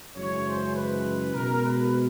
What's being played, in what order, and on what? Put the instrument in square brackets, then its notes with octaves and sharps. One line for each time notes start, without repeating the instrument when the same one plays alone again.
[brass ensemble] F#2 C#3 E3 G#3 C#5
C5
B4
B2 G#3 A#4
B4